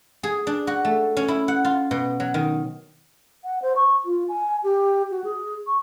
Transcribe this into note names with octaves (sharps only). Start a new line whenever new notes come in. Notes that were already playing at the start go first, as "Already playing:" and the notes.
G#4
D4
F#4
A3
C#4
E4
F#5
F4
B2
F#3
D#3
F#5
C5
C#6
F4
G#5
G4
F#4
G#4
C#6